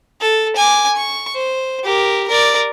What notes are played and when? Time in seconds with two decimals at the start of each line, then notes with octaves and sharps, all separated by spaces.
0.21 A4
0.56 G#5 D6
0.96 C#6
1.35 C5
1.84 G4 A#4
2.28 A#4 D5